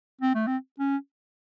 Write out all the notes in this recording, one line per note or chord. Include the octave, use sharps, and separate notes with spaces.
C4
A3
C4
C#4